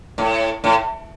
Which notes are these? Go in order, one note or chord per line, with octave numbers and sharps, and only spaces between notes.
A2
A2